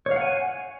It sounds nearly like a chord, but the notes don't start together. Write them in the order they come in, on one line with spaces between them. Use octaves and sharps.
C#5 F5 F#5 G#5